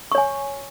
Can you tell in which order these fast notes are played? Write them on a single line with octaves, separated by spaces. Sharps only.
C#6 C#5 G#5